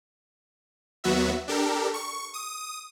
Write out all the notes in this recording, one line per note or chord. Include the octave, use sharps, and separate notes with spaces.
D#2 F#3 B3 F#4 E5
D4 G4 A4 A#4
C#6
D#6